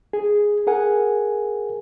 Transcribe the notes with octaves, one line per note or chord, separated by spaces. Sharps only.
G#4
G#4 A#4 F#5 G#5